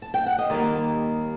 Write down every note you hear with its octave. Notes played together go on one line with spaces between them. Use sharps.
A5
G5
F#5
D#5
D#2 D#3 G3 A#3 D5